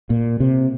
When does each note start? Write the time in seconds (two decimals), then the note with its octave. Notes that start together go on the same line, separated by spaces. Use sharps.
0.10 A#2
0.40 C3